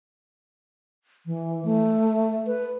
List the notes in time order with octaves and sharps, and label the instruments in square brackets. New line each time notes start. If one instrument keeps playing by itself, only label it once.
[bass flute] E3
A3
B4